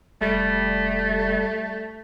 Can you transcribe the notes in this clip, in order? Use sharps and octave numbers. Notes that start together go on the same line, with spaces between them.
F1 G3 A3